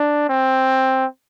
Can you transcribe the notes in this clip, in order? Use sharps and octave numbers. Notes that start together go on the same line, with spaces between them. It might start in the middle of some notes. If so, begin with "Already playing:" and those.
Already playing: D4
C4